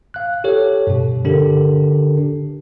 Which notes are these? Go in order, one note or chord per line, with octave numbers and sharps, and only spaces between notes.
F5 F#6
G4 A4 C#5
G2 B2
D3 D4 G4 A4 A#4